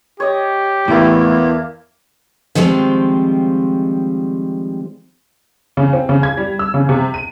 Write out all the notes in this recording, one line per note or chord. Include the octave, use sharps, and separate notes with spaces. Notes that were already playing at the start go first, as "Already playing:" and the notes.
G4 C#5 D#5
E2 A2 E3 A#3 E4 D5
D#3 F3 G3 G#3 C4
C#3
C4
C#3
G#6
G3
E6
C#3
C3
D#7